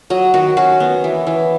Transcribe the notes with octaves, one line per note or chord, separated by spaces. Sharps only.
F#3 D#5
D#3 F#4
C#4 F#4
B3
E3
E3